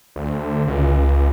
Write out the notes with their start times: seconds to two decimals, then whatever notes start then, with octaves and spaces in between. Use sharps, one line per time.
0.16 D2
0.68 C#2